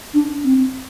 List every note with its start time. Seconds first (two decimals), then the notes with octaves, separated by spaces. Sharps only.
0.14 D4
0.44 C4